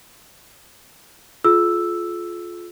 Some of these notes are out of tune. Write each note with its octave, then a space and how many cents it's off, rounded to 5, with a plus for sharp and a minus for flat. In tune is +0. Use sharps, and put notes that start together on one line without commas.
F4 +0 G#4 +45 E6 +0